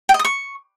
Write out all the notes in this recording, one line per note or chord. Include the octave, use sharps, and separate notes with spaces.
G5
D#5
D#6
C#6